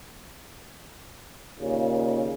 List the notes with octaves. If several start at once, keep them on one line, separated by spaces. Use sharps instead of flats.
D#2 A#2 C#3